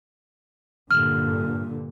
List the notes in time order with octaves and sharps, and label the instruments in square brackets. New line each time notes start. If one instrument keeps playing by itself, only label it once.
[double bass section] G2 A#2 D3 [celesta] F6